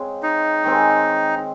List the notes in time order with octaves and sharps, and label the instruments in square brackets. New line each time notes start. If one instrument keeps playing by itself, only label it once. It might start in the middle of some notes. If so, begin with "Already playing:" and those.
Already playing: [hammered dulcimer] C#3 G#3 C4
[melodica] D#4
[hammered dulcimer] D#3 G#3 C4